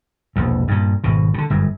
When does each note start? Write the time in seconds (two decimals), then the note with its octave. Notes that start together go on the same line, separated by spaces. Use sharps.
0.36 E1 A#1 E2
0.68 G2 A#2
1.04 G#1 B2
1.34 B2 D3
1.50 G1 F#2